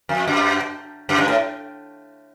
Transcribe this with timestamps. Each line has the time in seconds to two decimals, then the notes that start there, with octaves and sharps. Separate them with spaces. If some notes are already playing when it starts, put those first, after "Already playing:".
0.09 F2
0.28 F#2
1.09 F#2
1.18 G2
1.28 A2